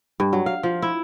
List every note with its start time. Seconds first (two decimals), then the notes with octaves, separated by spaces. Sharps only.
0.20 G2
0.33 F#3
0.46 F5
0.63 F3
0.82 E4